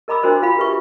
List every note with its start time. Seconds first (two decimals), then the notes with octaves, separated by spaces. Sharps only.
0.08 A#4 D#5 A#5 B5 D6 E6
0.23 D4 F#4 A#4 C5 D#5
0.42 F4 F5 B5
0.58 G4 B4 E5 C#6